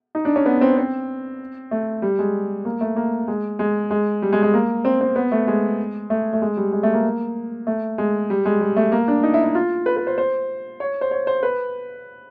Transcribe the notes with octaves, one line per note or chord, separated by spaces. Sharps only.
D#4
D4
C#4
B3
C4
C4
A3
G3
G#3
A#3
A3
A#3
G#3
G#3
G#3
G3
G#3
G#3
A#3
C4
C4
B3
A3
G#3
A3
A3
G#3
G3
G#3
A3
A#3
A3
G#3
G3
G#3
G3
A3
A#3
D4
D#4
E4
E4
F4
B4
B4
C5
C5
C#5
C5
C#5
C5
B4